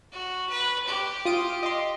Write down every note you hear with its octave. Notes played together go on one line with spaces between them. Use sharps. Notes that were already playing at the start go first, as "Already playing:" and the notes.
F#4
B4
G4
F4 D#6 D7
D#5 C6